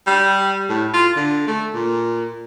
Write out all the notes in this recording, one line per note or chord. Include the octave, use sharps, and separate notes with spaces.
G3
A2
F4
D3
A3
A#2